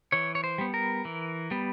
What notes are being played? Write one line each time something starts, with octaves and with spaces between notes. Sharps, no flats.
E3 C#5
C#5
C5
G3 B3
A#4
E3
G3 B3